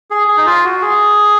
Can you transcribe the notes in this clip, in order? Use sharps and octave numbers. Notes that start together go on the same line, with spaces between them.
G#4
G#4
D#4
F4
F#4
G#4